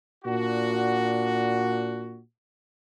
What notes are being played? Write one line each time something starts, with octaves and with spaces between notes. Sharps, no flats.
A#2 D4 F#4